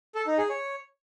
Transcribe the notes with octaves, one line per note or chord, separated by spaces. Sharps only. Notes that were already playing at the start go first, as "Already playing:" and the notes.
A4
D#4
G#4
C#5